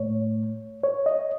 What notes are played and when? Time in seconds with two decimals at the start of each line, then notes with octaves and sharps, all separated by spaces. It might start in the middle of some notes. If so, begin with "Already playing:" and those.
Already playing: A2 A3 C#5
0.83 C#5
1.06 D#5